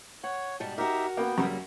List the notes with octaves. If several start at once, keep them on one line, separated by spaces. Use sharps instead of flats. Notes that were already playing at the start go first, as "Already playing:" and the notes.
C#5 F#5
G#2 B2 G3 A5
D#4 F#4 G4 A#4 E5
A#3 B3 G5
F#2 C#3 G3 A#3